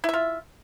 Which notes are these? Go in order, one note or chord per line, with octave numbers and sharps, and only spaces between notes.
E4 F4 E5